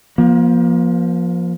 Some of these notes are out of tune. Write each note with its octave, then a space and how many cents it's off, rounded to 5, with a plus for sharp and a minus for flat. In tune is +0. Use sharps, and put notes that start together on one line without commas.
F3 +0 A#3 +35